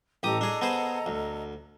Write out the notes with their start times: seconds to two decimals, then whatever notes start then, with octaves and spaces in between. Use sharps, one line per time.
0.23 A1 G4 A4 D#5 A#5 D#6
0.41 D4 G#4
0.61 B3 G#4 C5
1.06 D2